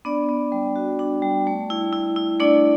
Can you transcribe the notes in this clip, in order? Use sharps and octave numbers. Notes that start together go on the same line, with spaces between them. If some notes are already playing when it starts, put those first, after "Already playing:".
B3 D4 D5
B3
G3
F#4
D4
G3
A3
E4
E4
E4
A3 D4 D5